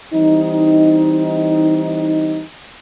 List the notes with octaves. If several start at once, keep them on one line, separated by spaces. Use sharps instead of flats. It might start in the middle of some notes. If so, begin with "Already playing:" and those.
E3 G3 C4 D#4